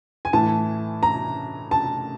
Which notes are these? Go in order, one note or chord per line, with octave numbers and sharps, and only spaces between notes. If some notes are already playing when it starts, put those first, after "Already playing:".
G#5
A2 E3 A5
A#5
A5